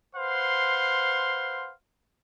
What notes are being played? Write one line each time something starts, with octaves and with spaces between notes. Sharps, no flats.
B4 C5 F5 F#5 C6